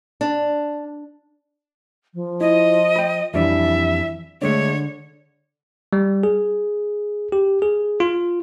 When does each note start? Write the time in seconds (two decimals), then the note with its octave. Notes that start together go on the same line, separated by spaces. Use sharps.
0.21 D4
2.14 F3
2.41 E4 D#5
2.96 G5 B5
3.34 F2 E3 G3 D4 E5
4.42 D3 G#3 A3 D4 C#5
5.93 G3
6.23 G#4
7.32 G4
7.62 G#4
8.00 F4